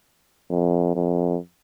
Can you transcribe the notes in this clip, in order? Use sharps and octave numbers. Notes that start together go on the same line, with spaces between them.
F2
F2